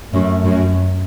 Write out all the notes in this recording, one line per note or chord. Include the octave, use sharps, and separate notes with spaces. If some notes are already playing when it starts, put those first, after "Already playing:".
F#2 A3
F#2